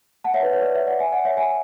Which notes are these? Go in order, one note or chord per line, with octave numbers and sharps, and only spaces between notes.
F#5 A5
C#5 E5
B4
C#5
B4 D5
C#5 E5
D5 F#5
E5 G#5
D5 F#5
C#5 E5
E5 G#5